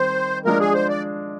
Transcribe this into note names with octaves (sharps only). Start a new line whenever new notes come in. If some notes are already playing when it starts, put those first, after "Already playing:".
Already playing: D#3 G3 C4 C5
F3 G#3 D4 A#4
G#4
C5
D5